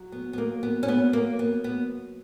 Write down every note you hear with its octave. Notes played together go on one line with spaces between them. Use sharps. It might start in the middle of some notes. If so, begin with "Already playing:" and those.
Already playing: F#3
B3
B3
A#3
B3
C#4
B3
A#3
B3
B3